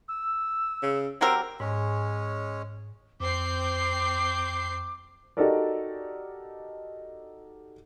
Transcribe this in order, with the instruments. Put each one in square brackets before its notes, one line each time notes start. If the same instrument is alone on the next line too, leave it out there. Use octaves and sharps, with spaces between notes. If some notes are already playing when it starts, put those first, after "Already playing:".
[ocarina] E6
[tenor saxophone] C#3
[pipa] F#3 G4 A#4 [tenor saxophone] C4 [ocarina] E6
[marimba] G#2 [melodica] G#3 C#4 C#5
[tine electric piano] F2 [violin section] C4 G6 C7 [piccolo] D6
[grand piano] D#4 F#4 G4 A4 A#4 D5